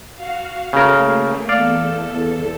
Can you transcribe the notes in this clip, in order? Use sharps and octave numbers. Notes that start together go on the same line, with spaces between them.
F#4 F5
C#3 A3 A#3 A#4
E2 A4 D5 F5